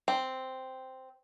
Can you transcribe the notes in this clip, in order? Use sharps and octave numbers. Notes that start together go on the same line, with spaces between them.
C4